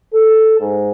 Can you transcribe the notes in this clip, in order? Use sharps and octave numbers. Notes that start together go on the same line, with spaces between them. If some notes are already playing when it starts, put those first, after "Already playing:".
A4
G#2